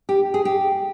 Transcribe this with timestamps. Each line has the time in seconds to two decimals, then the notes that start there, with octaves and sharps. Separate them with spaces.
0.09 G4
0.34 G#4
0.45 G4